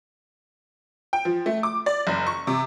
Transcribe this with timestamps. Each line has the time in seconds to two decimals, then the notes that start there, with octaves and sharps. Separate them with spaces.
1.13 G5
1.25 F3
1.46 A3
1.63 D6
1.86 D5
2.07 F#1
2.27 C#6
2.47 C3